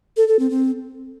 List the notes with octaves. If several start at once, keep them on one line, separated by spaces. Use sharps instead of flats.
A4
A4
C4
C4